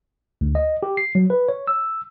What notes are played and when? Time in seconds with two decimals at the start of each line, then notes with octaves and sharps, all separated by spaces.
0.41 D2
0.55 D#5
0.83 G4
0.97 C7
1.15 F#3
1.30 B4
1.48 C#5
1.67 E6